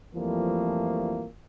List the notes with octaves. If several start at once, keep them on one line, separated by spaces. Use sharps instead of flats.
F2 E3 F3 G3 A3 A#3